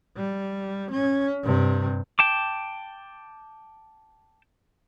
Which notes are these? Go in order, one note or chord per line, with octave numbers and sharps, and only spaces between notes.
G3
C#4
G2 C3
G5 A5 D6